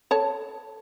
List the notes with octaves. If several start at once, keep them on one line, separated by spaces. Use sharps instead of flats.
A4 C#5 A5